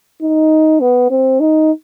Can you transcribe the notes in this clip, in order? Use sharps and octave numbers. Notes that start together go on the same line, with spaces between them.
D#4
B3
C4
D#4